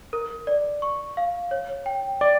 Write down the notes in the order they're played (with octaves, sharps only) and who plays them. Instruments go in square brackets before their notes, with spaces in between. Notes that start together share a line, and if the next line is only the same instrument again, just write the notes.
[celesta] A#4
D5
C#6
F5
C#5
G5
[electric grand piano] D5 [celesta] D6